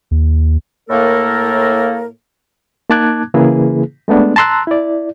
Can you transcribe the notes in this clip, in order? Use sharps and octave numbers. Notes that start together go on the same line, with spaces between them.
D#2
A2 A#3 A4 A#4
A#3 D#4 A5 D6 F#6 G#6
C#3 E3 A#3 E4 G#4 B4
G#3 A3 B3 D4
A5 A#5 C6 E6 F#6
E4 D5